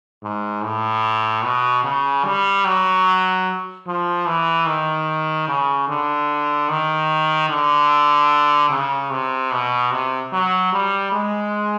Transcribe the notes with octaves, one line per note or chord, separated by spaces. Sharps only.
G#2
A2
B2
C#3
G3
F#3
F3
E3
D#3
C#3
D3
D#3
D3
C#3
C3
B2
C3
F#3
G3
G#3